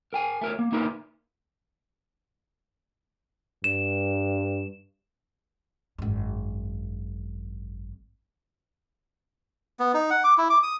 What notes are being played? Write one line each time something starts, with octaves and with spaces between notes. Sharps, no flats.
A#4 G5 G#5
A3 A#4 C#5
A#3
A#3 D#4 A#4 B4 E5
G2 E7
G#1 F#2
B3
D#4
F#5
D6
E4
D6
D#6